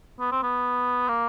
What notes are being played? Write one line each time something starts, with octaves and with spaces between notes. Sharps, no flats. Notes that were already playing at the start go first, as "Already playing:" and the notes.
B3
C4
B3
A#3